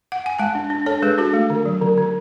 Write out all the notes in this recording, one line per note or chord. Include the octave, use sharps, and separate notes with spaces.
F#5
G#5
G#3 F#5 A5
D4
D4
D4 A4 C#5
G#3 G#4 B4
D4 F#4 A4
A3
D3
F#3
D3
D3